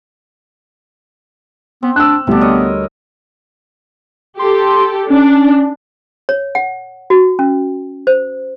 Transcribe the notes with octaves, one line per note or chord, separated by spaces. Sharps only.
B3 C4
D4 E6 F#6
D2 C3 G3 B3 D4
A#4 C#5 D#5
G4 A4 C6
C#4 D4
C#5
F#5
F#4
C#4
C5